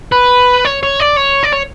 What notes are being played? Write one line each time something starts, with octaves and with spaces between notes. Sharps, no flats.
B4
C#5
C#5
D5
C#5
D5
C#5